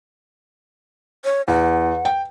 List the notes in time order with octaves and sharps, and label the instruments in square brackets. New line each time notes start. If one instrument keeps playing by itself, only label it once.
[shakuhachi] C#5
[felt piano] E2 [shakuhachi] F#5
[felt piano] G5